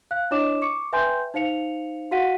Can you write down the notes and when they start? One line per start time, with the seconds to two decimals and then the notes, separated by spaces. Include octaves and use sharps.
0.11 F5 F#6
0.31 D4 E4 C#5 D#5 D6 E7
0.61 C#6 D6 C#7
0.93 B4 E5 G5 G#5 C6 G6
1.34 D#4 C5 F5 C#7 F7
2.11 F#4 F5 F#5 B6 D#7